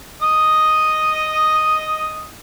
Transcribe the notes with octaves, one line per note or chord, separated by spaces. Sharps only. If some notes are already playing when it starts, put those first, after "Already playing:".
D#5 D#6